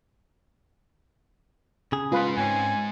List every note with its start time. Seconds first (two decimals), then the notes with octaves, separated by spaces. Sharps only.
1.92 C#3 G#4
2.12 G#3 F4 B4 C5
2.37 G#2 C4 C#4 G#5